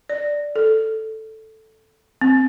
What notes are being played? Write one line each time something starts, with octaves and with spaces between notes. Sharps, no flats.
D5
A4
C4